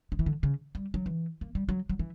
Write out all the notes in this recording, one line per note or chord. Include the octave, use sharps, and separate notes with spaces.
D3
E3
D3
C#3
G3
F#3
E3
A#3
G3
F#3
F#3
E3